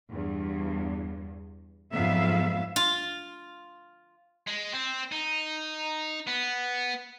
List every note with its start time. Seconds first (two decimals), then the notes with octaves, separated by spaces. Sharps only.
0.10 E2 G2
1.92 F2 G#2 F#3 B3 E5 F5
2.76 F4
4.47 G#3
4.73 C4
5.12 D#4
6.27 B3